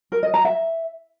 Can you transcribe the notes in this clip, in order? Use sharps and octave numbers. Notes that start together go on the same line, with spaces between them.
A#4
D#5
A#5
E5